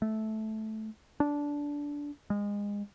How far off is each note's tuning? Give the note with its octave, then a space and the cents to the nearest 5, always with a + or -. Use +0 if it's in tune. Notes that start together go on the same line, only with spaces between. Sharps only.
A3 -10
D4 -15
G#3 -25